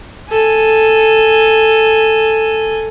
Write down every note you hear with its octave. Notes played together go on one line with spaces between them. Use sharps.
A4 G#5